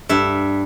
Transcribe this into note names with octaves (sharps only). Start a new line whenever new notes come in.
G2 E5